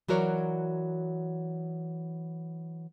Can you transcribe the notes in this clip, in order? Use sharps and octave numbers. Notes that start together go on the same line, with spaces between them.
E3 F#3 F#4 A#4 C#5 D5